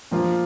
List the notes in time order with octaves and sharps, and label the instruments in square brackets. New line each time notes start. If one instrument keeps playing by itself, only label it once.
[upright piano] A#2 F3 A#3 F4